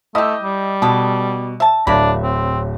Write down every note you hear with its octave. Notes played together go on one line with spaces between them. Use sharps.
A3 E4 G4 D#5 D#6 E6
G3
B2 B3 A4
E5 A5
D1 A#3 D4 E5 B5
C4